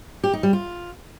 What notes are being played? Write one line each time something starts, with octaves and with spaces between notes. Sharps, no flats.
G4
D#4
G3
F4